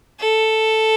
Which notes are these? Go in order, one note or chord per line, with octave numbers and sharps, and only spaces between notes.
A4